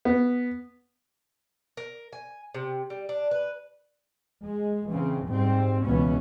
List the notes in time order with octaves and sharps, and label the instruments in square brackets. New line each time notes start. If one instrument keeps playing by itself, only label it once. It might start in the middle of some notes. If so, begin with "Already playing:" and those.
[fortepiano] B3
[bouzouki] A#4
G#5
C3
G3
D4
B4
[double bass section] G#3
C#3 E3 C4
G#2 G3 C4
C#2 B2 E3 B3 C#4